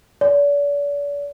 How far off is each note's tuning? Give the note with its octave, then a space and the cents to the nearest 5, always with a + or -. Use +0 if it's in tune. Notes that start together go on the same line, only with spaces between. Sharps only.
D5 -40